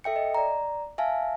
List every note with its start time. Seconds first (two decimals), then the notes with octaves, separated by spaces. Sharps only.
0.04 A4 E5 G5 C#7
0.16 D#5
0.35 D5 A#5
0.98 E5 F5 G#5 A5